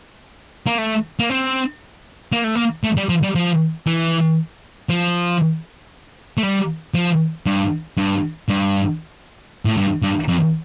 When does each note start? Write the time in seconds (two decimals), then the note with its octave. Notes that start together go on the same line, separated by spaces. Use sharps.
0.66 A#3
0.78 A3
1.19 A#3
1.30 C4
2.32 A#3
2.44 A3
2.55 A#3
2.84 A3
2.97 G3
3.09 F3
3.23 G3
3.35 F3
3.86 E3
4.89 F3
6.37 A3
6.43 G3
6.94 F3
7.46 G2
7.97 G2
8.48 G2
9.65 A2
9.77 G2
10.02 G2
10.28 F2